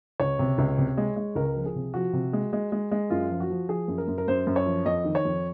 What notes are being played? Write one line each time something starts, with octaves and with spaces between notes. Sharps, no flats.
C#2 C#5
C3
C#2
C3
G#3
G#3
C#2 A#4
F3
G#4
C3
F3 F#4
C3
G#3
G#3
G#3
G#3
F#2 F4
F3
F#4
F3
F3 G#4
F#2
A#4
F#2
A#4
F#2 C5
F#2
C#5
F3
F2 D#5
D#3
C#5
F2